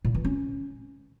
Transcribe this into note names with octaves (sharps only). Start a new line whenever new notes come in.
A#2
E3
C#4